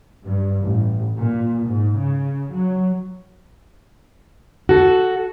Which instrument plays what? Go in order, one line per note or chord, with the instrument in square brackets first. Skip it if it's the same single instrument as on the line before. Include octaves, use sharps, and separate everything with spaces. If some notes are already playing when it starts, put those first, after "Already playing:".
[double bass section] G2
A1
A#2
G#2
C#3
F#3
[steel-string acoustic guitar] F#4 A4